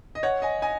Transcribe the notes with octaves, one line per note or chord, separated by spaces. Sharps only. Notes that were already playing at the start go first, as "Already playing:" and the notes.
D#5
C#5 F#5
D#5 G#5
D#5 G#5